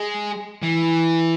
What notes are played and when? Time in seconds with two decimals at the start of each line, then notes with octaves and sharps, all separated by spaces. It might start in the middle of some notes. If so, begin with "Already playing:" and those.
Already playing: G#3
0.63 E3